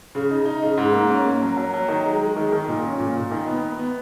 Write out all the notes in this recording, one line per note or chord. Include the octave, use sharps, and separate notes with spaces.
C#3
D#4
D#4
C#3
G#2
A#3
C#4
A#3
F#3
F#3
F#3
D#3
G#3
G#3
D#3
D#3
A#2
C#4
A#2
A#2
D#3
B3
B3
B3